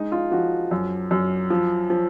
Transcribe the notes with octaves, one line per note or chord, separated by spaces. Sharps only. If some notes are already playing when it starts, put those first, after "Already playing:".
Already playing: G#3 D#4
F4
F3 F#4
F#2
F#2
F3
F3